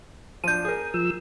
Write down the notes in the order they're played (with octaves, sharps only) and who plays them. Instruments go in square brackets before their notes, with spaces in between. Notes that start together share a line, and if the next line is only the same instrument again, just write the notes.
[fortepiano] F3 D4 [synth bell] G6 D#7
[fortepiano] G#4 A#4
[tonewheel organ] F3 E6